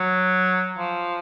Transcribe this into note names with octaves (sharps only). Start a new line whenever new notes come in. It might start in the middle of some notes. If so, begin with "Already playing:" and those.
Already playing: F#3
F3